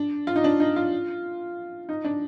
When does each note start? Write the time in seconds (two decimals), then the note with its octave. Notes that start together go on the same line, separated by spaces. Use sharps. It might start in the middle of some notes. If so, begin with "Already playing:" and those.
Already playing: D4
0.27 F4
0.36 D#4
0.44 D4
0.60 D#4
0.76 F4
1.89 D#4
2.04 D4